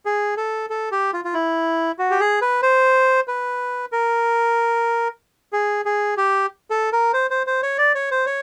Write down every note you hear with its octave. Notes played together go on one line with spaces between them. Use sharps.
G#4
A4
A4
G4
F4
F4
E4
F#4
G4
G#4
B4
C5
B4
A#4
G#4
G#4
G4
A4
A#4
C5
C5
C5
C#5
D5
C#5
C5
C#5